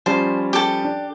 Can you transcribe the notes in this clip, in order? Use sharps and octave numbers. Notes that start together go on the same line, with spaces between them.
F3 G3 C#4 C5 A5
G4 A4
D4